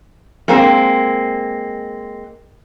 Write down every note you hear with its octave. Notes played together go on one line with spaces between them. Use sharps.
G#3 A#3 C4